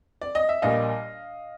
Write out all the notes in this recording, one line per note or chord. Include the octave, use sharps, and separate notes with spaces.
D5
D#5
E5
A#1 A#2 G3 A#3 D#5 F5